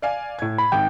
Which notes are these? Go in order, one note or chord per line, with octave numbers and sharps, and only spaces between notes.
D5 F5 G#5
A2 G#6
B5
G#1 G#2 G5